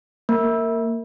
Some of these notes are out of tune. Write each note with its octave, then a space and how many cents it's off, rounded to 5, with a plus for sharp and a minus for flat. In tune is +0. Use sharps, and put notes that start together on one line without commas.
A#3 -20